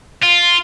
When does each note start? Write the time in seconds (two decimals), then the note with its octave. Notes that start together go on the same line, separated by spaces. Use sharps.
0.23 F4